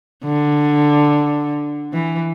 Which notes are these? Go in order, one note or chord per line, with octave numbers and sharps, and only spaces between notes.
D3
E3